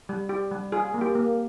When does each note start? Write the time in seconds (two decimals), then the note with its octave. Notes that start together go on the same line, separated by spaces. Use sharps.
0.09 G3
0.29 G4
0.52 G3
0.72 F4 G#4
0.94 A#3
1.01 G4
1.15 A#3